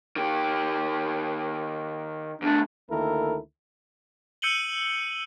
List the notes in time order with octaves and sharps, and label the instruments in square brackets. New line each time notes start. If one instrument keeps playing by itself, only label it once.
[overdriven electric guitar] D#3 G4
[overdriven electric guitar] E2 A3 [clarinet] D4
[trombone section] D2 D#3 A#3 E4 A4 A#4
[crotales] E6 G6 C#7 D#7 F#7 G7